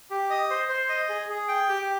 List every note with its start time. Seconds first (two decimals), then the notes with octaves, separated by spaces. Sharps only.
0.10 G4
0.30 D#5
0.50 C5
0.69 C5
0.89 D#5
1.09 G#4
1.29 G#4
1.48 G5
1.69 G4